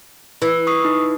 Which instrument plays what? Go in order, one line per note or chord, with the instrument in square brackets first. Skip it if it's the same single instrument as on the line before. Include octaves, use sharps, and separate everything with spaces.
[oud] E3
[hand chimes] C#6 D#6 C7
D#4